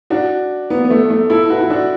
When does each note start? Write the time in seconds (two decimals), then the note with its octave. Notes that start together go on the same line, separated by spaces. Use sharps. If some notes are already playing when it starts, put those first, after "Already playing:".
0.10 D4 F#4
0.70 B3
0.84 B3
0.90 A3
1.10 A3
1.30 E4 A4
1.50 F#4 B4
1.61 E4
1.70 D4 F#4